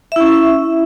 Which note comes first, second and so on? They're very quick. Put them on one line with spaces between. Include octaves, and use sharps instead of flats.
E5 E4 C#4